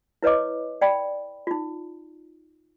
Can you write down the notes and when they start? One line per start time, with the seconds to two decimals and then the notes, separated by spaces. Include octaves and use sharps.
0.23 E4 B4 C#5 D#5 D6
0.81 D5 G5 B5
1.47 D#4 F4